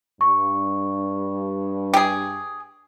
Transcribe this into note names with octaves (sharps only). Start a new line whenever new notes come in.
G2 C#6
G4 G#4